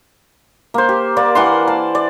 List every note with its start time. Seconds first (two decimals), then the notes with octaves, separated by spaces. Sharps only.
0.74 A#3 C5
0.89 G4
1.17 A#3 D5
1.35 E3 F#5 C6
1.68 A5
1.95 D5